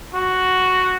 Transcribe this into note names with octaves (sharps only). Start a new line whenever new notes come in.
F#4